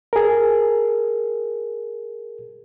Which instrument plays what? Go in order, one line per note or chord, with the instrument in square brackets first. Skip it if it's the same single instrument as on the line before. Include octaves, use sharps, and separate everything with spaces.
[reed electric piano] G#4 A#4